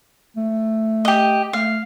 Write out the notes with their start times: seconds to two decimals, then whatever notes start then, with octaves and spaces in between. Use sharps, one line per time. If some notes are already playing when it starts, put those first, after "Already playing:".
0.37 A3
1.05 G4 D#5
1.53 A3 F5